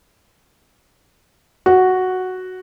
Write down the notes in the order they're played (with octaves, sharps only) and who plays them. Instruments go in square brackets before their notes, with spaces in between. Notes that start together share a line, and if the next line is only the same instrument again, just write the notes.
[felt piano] F#4